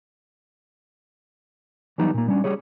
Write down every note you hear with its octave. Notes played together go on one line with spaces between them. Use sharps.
E3 F#3 G3 B3 D#4
A#2 A#3
G3 C#4 D4
G3 G#4 C#5